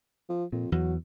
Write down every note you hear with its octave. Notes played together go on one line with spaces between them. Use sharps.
F3
F2 A#2
E2 E3 F#3